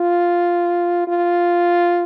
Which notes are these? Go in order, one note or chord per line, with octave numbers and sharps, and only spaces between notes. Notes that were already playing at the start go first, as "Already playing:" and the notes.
Already playing: F4
F4